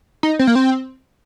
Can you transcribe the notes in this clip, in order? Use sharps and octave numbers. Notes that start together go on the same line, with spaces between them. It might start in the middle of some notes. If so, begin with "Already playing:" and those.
D#4
C4
A#3
C4